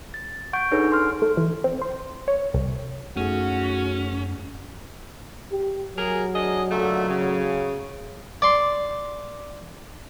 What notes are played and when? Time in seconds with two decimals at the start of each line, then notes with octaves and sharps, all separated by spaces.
0.14 A6
0.53 F#5 C#6 G6 D7
0.71 D4 D#4 G#4 A4 B4 C#5
0.92 C6 F6
1.22 A3
1.37 E3
1.64 C4
1.82 C5
2.28 C#5
2.54 C2
3.17 F#2 A3 C#4 D#4 F#4 G#4
5.52 G4
5.97 F#3 G#4 A#4
6.33 D4 G#4 D#5
6.70 A#2 D3 A3
7.08 C#3
8.42 D5 C6